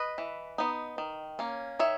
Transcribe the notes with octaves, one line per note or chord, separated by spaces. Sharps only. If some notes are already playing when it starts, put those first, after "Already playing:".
Already playing: B4 D#5
E3
B3 D#4
D#3
A#3 C#4
D#3 C#5 E5